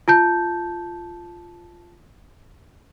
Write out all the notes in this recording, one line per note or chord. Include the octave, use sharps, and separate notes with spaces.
F4 A5 G6